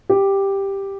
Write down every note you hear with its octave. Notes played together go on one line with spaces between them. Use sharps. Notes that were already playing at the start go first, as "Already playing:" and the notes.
G4